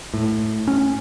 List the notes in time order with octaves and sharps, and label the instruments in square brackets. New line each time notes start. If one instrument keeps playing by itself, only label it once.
[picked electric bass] A2
C#4